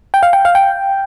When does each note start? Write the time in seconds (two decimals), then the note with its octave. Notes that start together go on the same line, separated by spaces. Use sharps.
0.14 G5
0.23 F5
0.33 G5
0.45 F5
0.55 G5